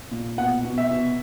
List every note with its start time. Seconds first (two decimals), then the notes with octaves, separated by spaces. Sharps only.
0.11 A#2
0.38 B2 F#5
0.65 B2
0.78 E5
0.91 B2